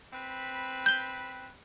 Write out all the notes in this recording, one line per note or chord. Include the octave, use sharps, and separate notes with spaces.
C4 B4 B5
G6 G7